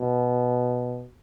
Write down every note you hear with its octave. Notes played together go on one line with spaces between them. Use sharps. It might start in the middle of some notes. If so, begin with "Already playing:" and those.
Already playing: B2